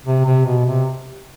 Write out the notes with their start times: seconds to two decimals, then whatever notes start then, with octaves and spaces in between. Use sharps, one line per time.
0.06 C3
0.25 C3
0.46 B2
0.66 C3